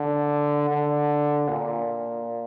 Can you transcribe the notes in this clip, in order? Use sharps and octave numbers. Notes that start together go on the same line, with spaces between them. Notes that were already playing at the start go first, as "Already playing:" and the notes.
Already playing: D3
D3
A#2